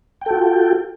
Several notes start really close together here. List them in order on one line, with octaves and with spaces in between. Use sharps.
G5 A4 F#4 F4